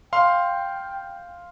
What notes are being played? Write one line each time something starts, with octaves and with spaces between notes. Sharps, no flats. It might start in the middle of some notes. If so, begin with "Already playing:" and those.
F5 G5 C6